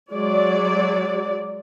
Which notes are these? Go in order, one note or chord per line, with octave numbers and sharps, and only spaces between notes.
F#3 G#3 D5